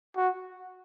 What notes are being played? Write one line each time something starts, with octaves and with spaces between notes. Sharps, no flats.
F#4